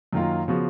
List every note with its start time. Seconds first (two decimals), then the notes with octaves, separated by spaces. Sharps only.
0.13 F#2 D#3 A#3 F4
0.48 C#3 F3 B3 F#4